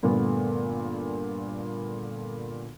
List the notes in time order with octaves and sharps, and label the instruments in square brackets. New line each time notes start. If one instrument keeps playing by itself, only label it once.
[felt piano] G2 A#2 D3 A3 B3